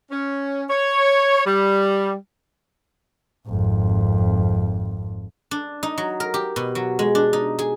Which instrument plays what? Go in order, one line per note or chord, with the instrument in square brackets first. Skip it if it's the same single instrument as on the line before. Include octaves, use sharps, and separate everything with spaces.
[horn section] C#4
C#5
G3
[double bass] G#1 F2
[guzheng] D4
D#4
F#3
A#4
G4
B2
F#3
G#3
D4
D#4
G#4